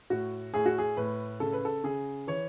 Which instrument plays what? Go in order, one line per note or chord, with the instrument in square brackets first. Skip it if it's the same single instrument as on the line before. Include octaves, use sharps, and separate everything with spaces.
[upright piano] A2 F#4
A2 G#4
F#4
G#4
A2 B4
C#3 A4
B4
A4
C#3 G#4
E3 C#5